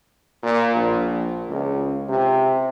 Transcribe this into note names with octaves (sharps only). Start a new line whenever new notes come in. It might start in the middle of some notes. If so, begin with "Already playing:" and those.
A#2
A#1
C#2
C3